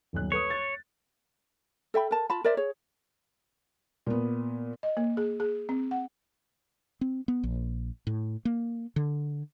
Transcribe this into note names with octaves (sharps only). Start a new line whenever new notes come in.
D#1 B1 F#6
A4 B4 C#5 D#6
A6
A4 E5 G5 B5
A#4 A5
F4 A5 B5
A#4 C5 D5 E5
G#4 C#5
A#2 B3
D#5
A#3
G#4
G#4
C4
F#5
C4
B3
A#1
A2
A#3
D3